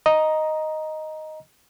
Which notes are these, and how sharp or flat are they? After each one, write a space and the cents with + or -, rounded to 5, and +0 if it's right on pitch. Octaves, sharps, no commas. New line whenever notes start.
D#5 +0 A#5 +10